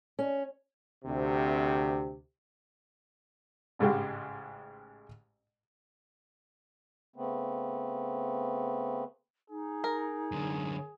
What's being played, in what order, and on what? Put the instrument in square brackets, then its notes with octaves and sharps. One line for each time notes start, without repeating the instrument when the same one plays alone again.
[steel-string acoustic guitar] C#4
[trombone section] D2 C3
[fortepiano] A1 G#2 C#3 G#3 G4
[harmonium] C#3 A3 B3 C4
[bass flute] D#4 [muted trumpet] G#4
[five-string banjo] A#4
[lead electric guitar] F#2 D3